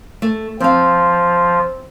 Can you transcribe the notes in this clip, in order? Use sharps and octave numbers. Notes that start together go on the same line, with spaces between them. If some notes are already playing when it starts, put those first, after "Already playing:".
A3
F3 C4 F5